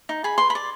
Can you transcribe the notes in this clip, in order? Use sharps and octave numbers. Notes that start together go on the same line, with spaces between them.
D#4
G#4 B5
B4 C6
B5
D5